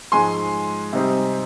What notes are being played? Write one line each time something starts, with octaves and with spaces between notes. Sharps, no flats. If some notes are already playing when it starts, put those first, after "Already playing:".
G#2 F3 G#3 G#5 C6
C3 G3 C4 D#4